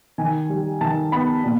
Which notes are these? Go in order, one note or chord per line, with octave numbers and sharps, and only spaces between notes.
D#3 G#5
G3
D#3 A5
B3 B5
A#2